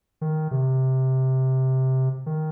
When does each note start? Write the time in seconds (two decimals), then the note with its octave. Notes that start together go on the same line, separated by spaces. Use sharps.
0.21 D#3
0.51 C3
2.26 D#3